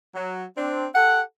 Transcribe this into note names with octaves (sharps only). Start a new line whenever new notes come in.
F#3
C4 D4
G4 A4 F#5